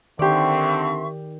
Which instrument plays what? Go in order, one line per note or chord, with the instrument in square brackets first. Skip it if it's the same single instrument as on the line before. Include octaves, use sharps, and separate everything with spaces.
[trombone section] D3 C4 [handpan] D#3 [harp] G4 D5 [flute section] E5 C6 C#6